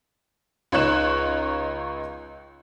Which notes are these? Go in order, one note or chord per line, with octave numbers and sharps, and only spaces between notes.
C#2 D#4 C#5 F#6 E7